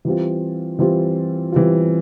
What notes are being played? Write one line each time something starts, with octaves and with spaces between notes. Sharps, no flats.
E3 G3 C4 F4
E3 G3 C4 F4
E3 G3 C4 F4